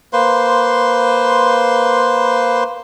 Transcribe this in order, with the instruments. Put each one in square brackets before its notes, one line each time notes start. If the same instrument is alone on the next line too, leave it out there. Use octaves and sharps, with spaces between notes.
[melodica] A#3 B4 C5 C6